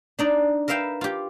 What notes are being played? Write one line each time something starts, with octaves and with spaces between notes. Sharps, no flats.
D4 D#4 D5
A#4 B4 E5 F5 G5
F4 G4